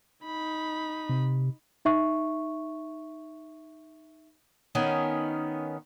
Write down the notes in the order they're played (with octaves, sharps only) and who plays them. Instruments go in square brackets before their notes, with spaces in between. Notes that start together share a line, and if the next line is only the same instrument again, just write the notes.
[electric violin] D#4 B5
[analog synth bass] C3
[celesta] D#4 E5 C#6
[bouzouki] D#3 B3 C#4